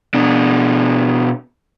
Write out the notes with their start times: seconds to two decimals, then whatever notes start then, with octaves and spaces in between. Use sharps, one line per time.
0.14 B2 D4